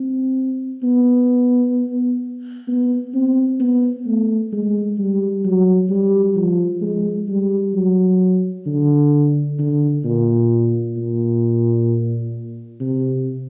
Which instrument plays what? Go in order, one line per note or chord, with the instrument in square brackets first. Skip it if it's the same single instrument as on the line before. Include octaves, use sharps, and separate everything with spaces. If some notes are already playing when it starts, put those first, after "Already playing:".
Already playing: [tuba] C4
B3
B3
C4
B3
A3
G#3
G3
F#3
G3
F3
G#3
G3
F#3
D3
D3
A#2
A#2
C3